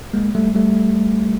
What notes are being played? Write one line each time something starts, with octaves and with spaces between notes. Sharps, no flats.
G#3 A#3
G3 A3
G3 A3